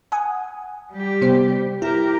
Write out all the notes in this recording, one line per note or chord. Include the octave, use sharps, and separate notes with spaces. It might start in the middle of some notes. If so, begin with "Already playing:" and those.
F#5 G#5 D#6
G3 G4
C3 B3 C5
E4 G4 A#4